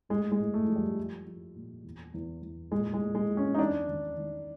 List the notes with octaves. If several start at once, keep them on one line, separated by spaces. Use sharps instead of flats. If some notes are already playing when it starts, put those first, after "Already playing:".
A2 G#3
G#3
A2
A3
F3
G3
F3
F3
A#2
E2
E2
E2
A#2 G#3
G#3
A#2
G#3
A#2
C#4
D#4
E2 D4
D#3
D#3